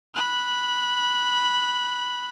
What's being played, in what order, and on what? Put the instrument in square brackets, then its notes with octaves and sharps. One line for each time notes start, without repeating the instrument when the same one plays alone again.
[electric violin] B5 F#6